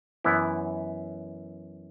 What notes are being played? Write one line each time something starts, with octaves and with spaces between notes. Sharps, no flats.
F#2 E3 B3 E4